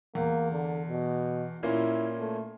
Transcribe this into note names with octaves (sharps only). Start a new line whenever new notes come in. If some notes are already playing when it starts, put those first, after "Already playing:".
E2 A#3
D3
B2
A#2 A#3 C#4 E4
A3